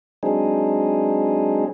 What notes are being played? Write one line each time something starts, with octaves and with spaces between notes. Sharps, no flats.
F#3 G#3 C4 D4 D#4 G#4